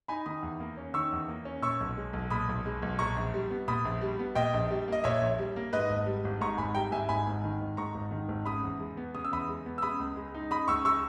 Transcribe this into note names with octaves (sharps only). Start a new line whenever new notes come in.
D#4 G#5 B5
D#3 B5 D#6
E2
A#3
C#4
D#3 C#6 E6
E2
A#3
C#4
A#2 C#6 E6
B1
G#3
B1
A#2 B5 D#6
B1
G#3
B1
A#2 A#5 C#6
A#1
G3
B3
A#2 B5 D#6
A#1
G3
B3
A#2 D#5 G5
A#1
G3
A#3 D#5
A#2 C#5 E5
A#1
G3
A#3
G#2 B4 D#5
G#1
G3
G#1
G#2 A#5 C#6
G#1 G#5 B5
G3 G5 A#5
G#1 E5 G#5
G#2 G#5 B5
G#1
D#3
G#1
G#2 A#5 C#6
G#1
D#3
G#1
C#3 B5 D#6
E2
G#3
B3
C#3 D#6
E6
E2 B5 D#6
G#3
B3
E6
C#3 B5 D#6
C#2
G#3
D#4
C#3 B5 D#6
C#2 C#6 E6
G#3 C#6 E6